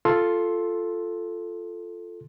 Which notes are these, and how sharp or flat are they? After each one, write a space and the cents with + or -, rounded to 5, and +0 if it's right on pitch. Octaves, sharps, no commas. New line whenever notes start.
F4 -5 A4 +0 C6 +10